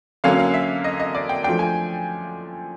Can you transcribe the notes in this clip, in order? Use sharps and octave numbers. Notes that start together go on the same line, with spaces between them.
D3 F#3 A#3 C#4 F5
F5
E5
D#5
D#5
D5
G5
F3 A3 D4 G5
G#5